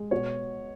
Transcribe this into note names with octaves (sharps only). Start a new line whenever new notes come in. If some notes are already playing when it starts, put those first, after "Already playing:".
Already playing: G#3
B2 C#5